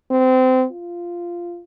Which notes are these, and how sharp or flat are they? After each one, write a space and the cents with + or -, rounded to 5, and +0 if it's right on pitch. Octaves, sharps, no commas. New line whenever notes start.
C4 -25
F4 -10